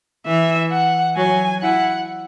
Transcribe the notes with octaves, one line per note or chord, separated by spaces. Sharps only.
E3 E5
F#5
F#3 G#5
E4 F#5